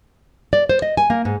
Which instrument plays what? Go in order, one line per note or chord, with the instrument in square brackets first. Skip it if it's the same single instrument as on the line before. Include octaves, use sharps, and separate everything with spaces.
[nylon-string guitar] D5
C5
D#5
G#5
A#3
G#2